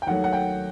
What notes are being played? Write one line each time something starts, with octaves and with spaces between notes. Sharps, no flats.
G5
D#2 D#3 F#3 A3 F#5
F#5
G5